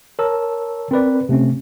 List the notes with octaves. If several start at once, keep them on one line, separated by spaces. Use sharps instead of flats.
A#4 C#5 A5 E6
C4 A#4 B4 D5
C3 A3 C4 C#4